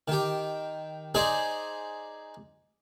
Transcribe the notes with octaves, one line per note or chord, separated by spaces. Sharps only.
D#3 G4
D#4 G#4 C5 D5